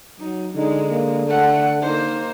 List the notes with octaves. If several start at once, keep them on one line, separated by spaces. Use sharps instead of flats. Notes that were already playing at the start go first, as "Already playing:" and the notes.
F#3 D#4
D3 G#3 D#4
A#3
A3 A4 F#5
A#3 D#4 C5